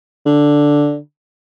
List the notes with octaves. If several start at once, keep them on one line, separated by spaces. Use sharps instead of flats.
D3